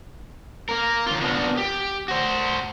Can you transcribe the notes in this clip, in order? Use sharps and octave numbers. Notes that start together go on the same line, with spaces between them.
A#3 A#4
D#3 F4
A#3 B3 D4 F4 F#4
G4
F#4 C5